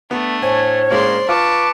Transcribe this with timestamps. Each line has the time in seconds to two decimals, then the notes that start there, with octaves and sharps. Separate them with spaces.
0.11 A3 B3 D4
0.42 A2 C5 C#5 G#5
0.91 G#3 A#3 C#4 D5 C6
1.29 F4 B4 A5 C#6 D6